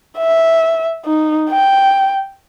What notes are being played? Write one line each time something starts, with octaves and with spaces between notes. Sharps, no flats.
E5
D#4
G5